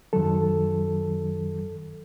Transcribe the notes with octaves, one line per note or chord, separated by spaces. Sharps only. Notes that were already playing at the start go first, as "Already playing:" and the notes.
F#2 D#3 F#3 A4